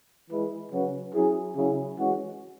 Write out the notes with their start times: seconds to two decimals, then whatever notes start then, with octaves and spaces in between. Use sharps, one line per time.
0.30 E3 G#3 E4 B4
0.72 C#3 F#3 C#4 F#4 B4
1.14 F#3 C#4 E4 G#4
1.56 C#3 F#3 C#4 E4 G#4
1.98 E3 G#3 C#4 F#4